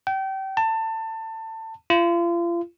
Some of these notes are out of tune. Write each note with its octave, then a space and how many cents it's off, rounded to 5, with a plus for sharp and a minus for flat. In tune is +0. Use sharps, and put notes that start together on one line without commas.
G5 -30
A5 +25
F4 -35